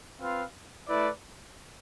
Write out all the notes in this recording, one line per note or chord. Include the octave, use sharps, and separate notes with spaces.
C4 F4 B4 F5
A3 E4 B4 D5